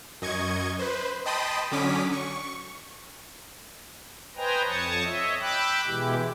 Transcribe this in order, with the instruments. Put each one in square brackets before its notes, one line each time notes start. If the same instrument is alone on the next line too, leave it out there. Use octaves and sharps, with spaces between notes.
[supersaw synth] F#2 D#5 C#6 G#6
B4 C5
D#5 G5 A5 B5 C6 D#6
D3 F#3 C#4 D6 D#6 B6
C#6
[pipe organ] B4 C5 D#5 G5 G#5 A#5
F2 C#5 A5 C#6 D#6
C#5 D#5 E5
G5 B5 D6 E6 F#6
B2 E3 G#3 E4 G4